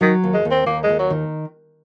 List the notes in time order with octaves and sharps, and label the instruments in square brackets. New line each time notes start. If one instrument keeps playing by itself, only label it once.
[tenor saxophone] D#3 [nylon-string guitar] F#3
[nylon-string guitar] D#2
[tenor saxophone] G#3
[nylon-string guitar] D#2
[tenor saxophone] C4
[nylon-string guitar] D#2 [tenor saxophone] A#3
[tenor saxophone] G#3
[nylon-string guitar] D#2
[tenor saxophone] F#3
[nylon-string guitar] D#3